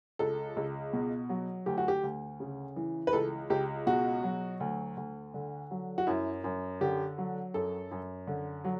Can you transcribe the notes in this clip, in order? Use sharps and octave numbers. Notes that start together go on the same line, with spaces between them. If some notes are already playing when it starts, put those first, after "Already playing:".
C#2 A4
C#2
B2
F#3
D2 G4
F#4
G4
D2
C#3
E3
B4
C#2 A4
C#2 G4
B2 F#4
F#3
D2
D2
D3
F#3
F#4
F#2 E4
F#2
D3 G4
F#3
F#2 A4
F#2
D3
F#3